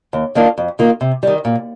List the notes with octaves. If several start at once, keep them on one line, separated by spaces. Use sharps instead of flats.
D#2
D#3 A#3 D4 F4
F2
D#3 A#3 F4
C3
D#3 G3
A#2